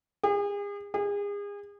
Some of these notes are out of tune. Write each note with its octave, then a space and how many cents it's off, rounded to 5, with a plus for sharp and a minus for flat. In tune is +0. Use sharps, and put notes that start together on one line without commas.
G#4 -40
G#4 -35